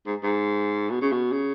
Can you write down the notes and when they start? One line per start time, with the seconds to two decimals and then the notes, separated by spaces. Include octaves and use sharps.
0.06 G#2
0.23 G#2
0.90 B2
1.01 C#3
1.12 B2
1.32 C#3